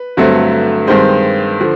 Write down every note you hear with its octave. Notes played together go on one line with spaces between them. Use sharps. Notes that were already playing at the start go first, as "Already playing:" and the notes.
Already playing: B4
G2 D3 F#3 A3 C4
G2 D#3 G#3 C4 C5
D3 F3